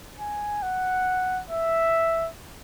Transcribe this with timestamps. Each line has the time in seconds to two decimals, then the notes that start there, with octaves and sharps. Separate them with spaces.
0.20 G#5
0.63 F#5
1.50 E5